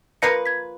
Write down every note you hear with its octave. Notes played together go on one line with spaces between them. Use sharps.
F3 A#3 F4 B4 A#6 C#7
G#6 B6